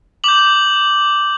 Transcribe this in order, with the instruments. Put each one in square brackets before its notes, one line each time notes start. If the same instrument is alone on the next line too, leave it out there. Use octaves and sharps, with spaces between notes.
[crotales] D6 G6 F#7